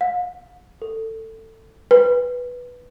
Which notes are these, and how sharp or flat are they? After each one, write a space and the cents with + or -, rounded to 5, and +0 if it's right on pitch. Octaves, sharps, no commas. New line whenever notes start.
F5 +40
A4 +20
B4 -5